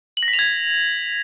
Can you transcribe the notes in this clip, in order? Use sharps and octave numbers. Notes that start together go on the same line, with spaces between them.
F#7
A#6
B6
F7
G#6